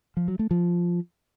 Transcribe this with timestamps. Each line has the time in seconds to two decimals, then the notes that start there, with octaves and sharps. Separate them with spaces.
0.17 F3
0.28 F#3
0.39 A3
0.51 F3